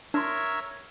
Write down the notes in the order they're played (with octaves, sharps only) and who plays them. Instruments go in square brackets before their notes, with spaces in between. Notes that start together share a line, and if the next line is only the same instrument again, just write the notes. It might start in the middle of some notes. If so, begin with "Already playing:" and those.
[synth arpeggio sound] D4 C6 [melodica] A#4 C#5 E5